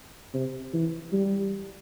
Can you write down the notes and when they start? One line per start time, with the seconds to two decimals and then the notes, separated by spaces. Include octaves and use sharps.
0.34 C3
0.73 E3
1.13 G3